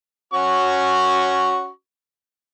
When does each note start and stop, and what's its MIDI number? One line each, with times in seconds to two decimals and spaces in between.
0.34 1.69 61
0.34 1.69 66
0.34 1.69 85